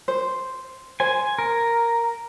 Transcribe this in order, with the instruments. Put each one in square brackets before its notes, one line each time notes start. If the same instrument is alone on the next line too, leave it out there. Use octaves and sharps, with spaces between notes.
[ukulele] C5
[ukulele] C5 [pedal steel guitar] G#5
[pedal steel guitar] A#4